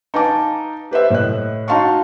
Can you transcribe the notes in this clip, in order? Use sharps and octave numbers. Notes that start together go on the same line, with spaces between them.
D#4 B4 F5 G#5 A5 D6
G4 B4 C5 E5
A2 D#5 F#6
D#4 F#4 F5 A5 C6 C#6